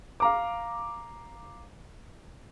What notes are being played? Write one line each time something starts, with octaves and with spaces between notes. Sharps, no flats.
F5 A#5 D6